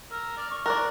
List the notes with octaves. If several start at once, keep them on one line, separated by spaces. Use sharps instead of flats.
A#4 E6
D5 F6
C#6
A#4 D5 F#6